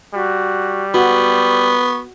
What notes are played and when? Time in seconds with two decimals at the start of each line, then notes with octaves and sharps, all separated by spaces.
0.14 G3 F#4
0.94 B3 F#4 C#6